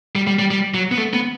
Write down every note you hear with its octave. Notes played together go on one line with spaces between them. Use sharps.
G3
G3
G3
G3
F#3
B3
A3
B3